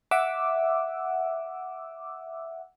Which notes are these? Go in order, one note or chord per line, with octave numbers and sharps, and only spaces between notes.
E5 F#5 D6 E6